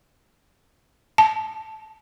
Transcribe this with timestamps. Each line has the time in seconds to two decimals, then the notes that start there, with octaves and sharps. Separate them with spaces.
1.18 A5